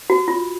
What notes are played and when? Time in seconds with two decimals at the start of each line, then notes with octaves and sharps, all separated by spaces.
0.10 F#4
0.28 F4